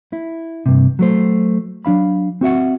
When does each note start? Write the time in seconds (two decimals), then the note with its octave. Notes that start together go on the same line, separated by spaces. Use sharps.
0.13 E4
0.66 G2 C3
0.99 F#3 A3 C5
1.85 F#3 D4 F5 B5
2.41 C4 F#4 E5 F#5